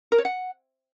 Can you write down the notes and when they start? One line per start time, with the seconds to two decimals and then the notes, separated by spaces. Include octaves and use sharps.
0.12 A#4
0.18 C#5
0.25 F#5